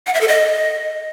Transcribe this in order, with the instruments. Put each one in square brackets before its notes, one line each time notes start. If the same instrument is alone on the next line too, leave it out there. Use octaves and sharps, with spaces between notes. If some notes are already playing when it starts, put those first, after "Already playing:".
[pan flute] F#5
E5
A4
D#5